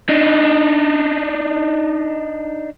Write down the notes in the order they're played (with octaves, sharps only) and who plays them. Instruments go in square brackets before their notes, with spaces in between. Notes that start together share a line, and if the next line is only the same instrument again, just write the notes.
[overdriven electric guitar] D4 D#4